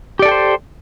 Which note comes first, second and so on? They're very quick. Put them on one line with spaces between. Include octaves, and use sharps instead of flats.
G4 D5 A4 G5 C5